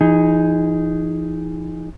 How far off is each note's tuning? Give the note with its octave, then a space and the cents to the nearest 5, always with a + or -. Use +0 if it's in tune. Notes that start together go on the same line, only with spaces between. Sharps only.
E3 +40 D#4 +5 G#4 -15